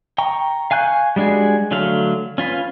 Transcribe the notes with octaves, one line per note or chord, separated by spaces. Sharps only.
G5 A#5 C#6
F5 G#5 C#6 F#6 G6
G3 G#3 D4 F#4 G#4
D3 F#3 A3 F5
C#4 F4 B4